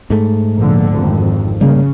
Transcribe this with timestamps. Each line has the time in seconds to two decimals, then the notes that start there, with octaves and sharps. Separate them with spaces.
0.10 G#2 A3
0.58 A#1 A#2 D3
0.90 G#1 F2
1.61 C#3 G3 A#3